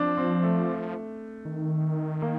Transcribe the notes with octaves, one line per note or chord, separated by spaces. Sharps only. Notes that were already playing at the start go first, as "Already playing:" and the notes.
Already playing: F3 C4 D4
C4
A3
D#3
A#3